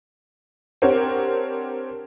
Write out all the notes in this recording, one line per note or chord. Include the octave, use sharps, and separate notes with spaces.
C4 D4 G4 A#4 C#5 F#5